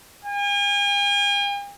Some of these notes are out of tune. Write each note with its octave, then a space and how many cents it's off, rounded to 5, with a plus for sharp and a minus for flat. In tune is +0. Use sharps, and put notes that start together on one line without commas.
G#5 -45